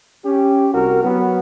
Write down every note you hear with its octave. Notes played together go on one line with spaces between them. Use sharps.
C#4 G4
C2 F#4 A#4
F#3 B3